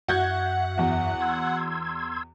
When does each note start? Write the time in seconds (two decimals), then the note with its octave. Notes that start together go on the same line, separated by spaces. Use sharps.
0.08 F#2 F#4 E5 F#5 G6 G#6
0.78 E2 F#4
1.20 C6 E6 G#6